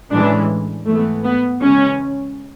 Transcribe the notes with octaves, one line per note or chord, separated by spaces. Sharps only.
A2 E3 G#3 C#4 D4
G#2 E3 A3 B3
B3
C#3 E3 G#3 C#4